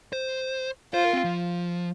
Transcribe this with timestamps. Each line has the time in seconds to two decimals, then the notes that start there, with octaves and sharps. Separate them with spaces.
0.13 C5
0.94 F4 C5
1.04 A#4
1.13 C4
1.24 F3